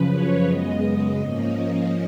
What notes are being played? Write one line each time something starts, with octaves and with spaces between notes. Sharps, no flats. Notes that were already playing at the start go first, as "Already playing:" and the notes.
Already playing: F#2 C#3 F3 B4
C#5
F#2 C#3 G#3 B3 D#5
G#2 F3 A#3 C#4